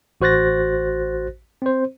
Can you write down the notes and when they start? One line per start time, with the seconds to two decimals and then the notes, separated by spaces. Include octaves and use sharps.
0.21 A1 F#4 C5 F#6 A6 A#6
1.62 C4 C5